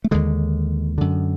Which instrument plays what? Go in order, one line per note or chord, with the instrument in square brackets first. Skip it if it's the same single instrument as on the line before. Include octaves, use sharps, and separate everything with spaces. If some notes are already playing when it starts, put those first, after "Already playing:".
[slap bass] A3
D#2 D3 G#3
F#2 D3